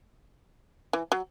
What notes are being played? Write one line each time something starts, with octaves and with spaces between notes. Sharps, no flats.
E3
F#3